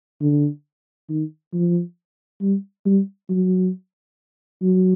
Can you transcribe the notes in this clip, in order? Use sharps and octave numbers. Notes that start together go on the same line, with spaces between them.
D3
D#3
F3
G3
G3
F#3
F#3